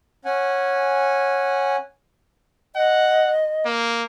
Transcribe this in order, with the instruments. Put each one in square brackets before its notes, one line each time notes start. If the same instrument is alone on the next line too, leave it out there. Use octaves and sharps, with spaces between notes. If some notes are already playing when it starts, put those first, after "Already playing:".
[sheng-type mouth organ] C#4 F#5 G#5
[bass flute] D#5 [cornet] F#5
[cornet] A#3